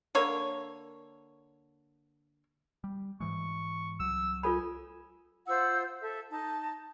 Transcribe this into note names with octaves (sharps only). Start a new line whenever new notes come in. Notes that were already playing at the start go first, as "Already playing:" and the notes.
D3 A#3 C#5
G3
G#2 E3 G#3 C#6
C2 F#3 E6
F4 A4 G#5 B5
F4 C5 F#5 E6
A4 E5
D#4 A5